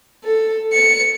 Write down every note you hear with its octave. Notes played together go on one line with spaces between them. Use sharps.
A4
C#7